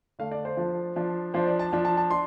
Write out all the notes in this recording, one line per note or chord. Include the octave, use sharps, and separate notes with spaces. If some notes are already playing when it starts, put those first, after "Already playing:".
D3 A3 D4 F5
D5
C5
F3 D4
F3 D4
F3 D4 C5
D5
A5
F3 D4
A5
A5
D4 C6